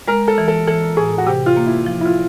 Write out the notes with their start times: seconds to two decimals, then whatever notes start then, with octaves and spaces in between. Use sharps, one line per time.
0.08 G#3 A#4
0.28 A4
0.38 E3
0.48 A4
0.67 E3 A4
0.97 A2 G#4
1.18 F#4
1.27 C3 G4
1.46 F4
1.57 A#3
1.66 E4
1.86 F3
2.01 E4
2.05 F4